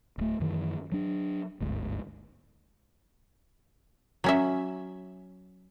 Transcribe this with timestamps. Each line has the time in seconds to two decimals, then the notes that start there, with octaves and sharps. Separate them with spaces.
0.18 D1 A3
0.40 F#2 D#3 E3
0.92 F#3 D4
1.60 G1 D2 G#2
4.24 F#3 C#4 E5